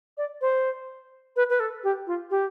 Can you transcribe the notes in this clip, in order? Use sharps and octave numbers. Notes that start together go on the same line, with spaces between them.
D5
C5
B4
B4
A4
G4
F4
G4